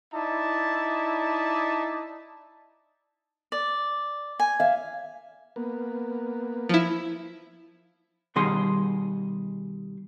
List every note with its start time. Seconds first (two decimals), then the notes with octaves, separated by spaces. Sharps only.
0.14 D#4 E4 D5 A5
3.52 D5
4.40 G#5
4.60 E5 F5
5.56 A#3 B3
6.69 F3 E4
8.36 B2 D#3 G3 G#4 C6